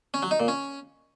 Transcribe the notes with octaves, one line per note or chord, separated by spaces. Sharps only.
C#4
F#3
D#4
A#2
C#4